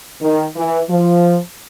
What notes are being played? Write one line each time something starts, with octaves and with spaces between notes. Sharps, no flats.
D#3
E3
F3